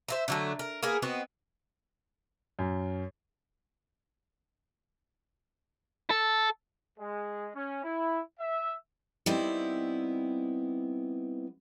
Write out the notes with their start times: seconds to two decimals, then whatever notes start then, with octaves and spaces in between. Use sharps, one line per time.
0.08 C5 E5 A#5
0.28 D3 F#3 A3
0.59 A#4
0.83 A#3 B3 G#4 A#4
1.02 B3 C4 F#4 D#5
2.59 F#2
6.10 A4
6.99 G#3
7.55 C#4
7.84 E4
8.40 E5
9.26 G3 B3 C4 D#4 E4